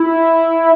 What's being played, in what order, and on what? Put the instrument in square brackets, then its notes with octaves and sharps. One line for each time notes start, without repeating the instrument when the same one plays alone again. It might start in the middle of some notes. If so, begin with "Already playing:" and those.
Already playing: [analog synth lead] E4